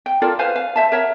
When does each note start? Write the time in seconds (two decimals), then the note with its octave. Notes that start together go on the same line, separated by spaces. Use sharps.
0.06 G5
0.22 F4 A4 A#4 D5
0.39 B4 C5 F5 G#5
0.56 F5
0.76 C5 E5 A5
0.92 A#4 C#5 E5 F#5